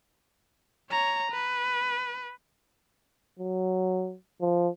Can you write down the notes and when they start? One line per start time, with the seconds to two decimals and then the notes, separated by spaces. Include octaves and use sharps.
0.90 C#5 A#5
1.32 B4
3.39 F#3
4.41 F3